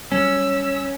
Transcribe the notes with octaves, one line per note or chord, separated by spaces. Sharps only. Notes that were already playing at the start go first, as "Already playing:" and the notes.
F#3 G3 C#4 E6